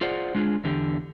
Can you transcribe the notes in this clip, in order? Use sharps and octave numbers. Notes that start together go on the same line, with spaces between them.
F4 G#4 C5 D5 F#5
G#3 D4 F4 G#4
E2 D3 G4